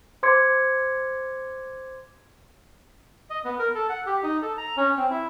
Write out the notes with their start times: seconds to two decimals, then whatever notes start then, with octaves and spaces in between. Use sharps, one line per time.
0.23 C5 C6 D6 G#6 C#7
3.30 D#5
3.45 B3
3.59 A#4
3.75 A4
3.90 F#5
4.06 G4
4.23 D#4
4.42 A4
4.57 A#5
4.77 C#4
4.97 C4
5.10 E4